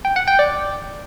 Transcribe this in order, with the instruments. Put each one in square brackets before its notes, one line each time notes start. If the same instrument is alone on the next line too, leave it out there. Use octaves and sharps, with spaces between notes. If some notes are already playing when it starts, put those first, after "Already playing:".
[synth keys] G5
F#5
G5
D5